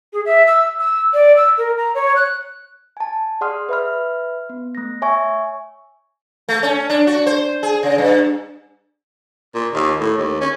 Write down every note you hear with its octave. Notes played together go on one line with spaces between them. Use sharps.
G#4
E5
E6
E6
D5
E6
A#4
A#5
C#5
F#6
G#5 A5
G#4 D5 F#5 C6 D#6 F6
B4 E5 B5 F6
B3
A3 A#6
C#5 E5 G#5 C#6
A3
C#4
D4
F#4
C5
G#4
C#3
G2
A#2
D#2
A2
D#2
C#4